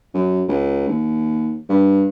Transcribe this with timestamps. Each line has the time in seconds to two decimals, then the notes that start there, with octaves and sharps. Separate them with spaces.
0.14 F#2
0.48 C#2
0.88 D#2
1.69 G2